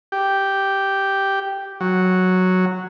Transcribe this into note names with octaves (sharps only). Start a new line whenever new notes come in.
G4
F#3